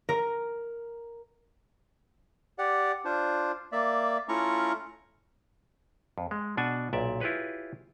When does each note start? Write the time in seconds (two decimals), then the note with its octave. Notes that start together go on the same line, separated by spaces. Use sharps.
0.09 A#4
2.58 G4 D5 F#5
3.05 D4 F4 C5
3.72 A#3 D5 E5
4.29 A3 C#4 E4 F4 A#5 C#6
6.18 F2
6.31 G#3
6.57 B2 D4 F#5 G#5 A5
6.93 B1 A#2 D5 E5
7.20 E4 F4 G4 G#4 B4 C#5